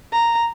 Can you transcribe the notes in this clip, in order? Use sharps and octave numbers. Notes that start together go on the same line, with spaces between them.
A#5